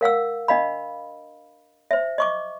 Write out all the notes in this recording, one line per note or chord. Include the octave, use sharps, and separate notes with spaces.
A#4 F5 F#5 E6
D4 D#5 F5 B5
C5 E5
D#5 C#6 D6